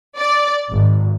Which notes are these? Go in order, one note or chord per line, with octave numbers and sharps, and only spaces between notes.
D5
G#1